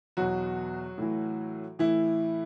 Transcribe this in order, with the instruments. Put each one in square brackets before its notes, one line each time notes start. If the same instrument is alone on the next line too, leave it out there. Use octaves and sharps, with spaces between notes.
[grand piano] E2 B2 F#3 F#4
A2 E3
A2 E3 E4